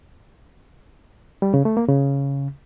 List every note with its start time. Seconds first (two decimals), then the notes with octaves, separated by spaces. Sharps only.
1.42 G3
1.54 C#3
1.65 A3
1.77 A#3
1.88 C#3